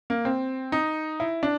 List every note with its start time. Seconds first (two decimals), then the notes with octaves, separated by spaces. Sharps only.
0.10 A#3
0.25 C4
0.72 D#4
1.20 E4
1.43 D4